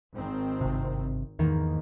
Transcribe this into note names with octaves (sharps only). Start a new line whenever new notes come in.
G#1 D#3 C4
G1 C3
E2 G#2 D#3 A#3